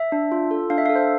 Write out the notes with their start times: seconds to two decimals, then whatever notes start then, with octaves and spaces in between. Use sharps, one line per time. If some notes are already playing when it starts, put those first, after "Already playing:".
Already playing: E5
0.12 D4
0.32 F4
0.51 A4
0.70 D4 F5
0.78 E5
0.86 F5
0.89 A4
0.96 C5